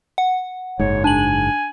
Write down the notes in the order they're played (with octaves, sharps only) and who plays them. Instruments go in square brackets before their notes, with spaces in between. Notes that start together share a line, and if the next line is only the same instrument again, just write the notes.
[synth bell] F#5
[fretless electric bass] F#1 G#2 [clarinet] C#5
[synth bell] D4 F#7 [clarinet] G#5